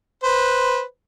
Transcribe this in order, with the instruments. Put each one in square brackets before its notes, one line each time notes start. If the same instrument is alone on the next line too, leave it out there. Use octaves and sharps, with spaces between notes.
[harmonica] B4 C5